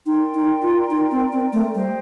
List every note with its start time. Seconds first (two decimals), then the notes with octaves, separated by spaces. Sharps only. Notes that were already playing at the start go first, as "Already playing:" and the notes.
0.06 D#4 A#4 D5 G5 C6
0.34 D#4
0.62 F4
0.90 D#4
1.11 C4
1.32 C4
1.53 A3
1.74 G3 C5 D#5 G5